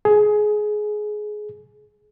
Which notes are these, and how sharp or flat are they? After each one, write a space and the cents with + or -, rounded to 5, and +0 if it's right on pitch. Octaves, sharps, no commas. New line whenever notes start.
G#4 +20